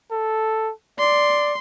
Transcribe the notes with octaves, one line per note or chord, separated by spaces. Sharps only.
A4
D5 C6